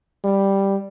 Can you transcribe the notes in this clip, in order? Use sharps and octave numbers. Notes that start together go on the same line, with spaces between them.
G3